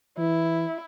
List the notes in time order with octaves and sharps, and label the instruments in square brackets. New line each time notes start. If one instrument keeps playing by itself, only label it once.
[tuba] E3 [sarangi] E4